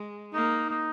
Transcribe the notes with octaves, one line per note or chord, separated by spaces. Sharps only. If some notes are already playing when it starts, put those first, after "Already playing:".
Already playing: G#3
A#3 D#4
D#4